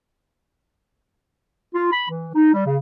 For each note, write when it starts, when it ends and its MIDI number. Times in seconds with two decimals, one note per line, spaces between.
1.74 1.88 65
1.92 2.06 83
2.09 2.29 52
2.34 2.53 63
2.54 2.65 55
2.66 2.76 49